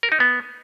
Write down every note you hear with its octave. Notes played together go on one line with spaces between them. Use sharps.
A#4
D#4
B3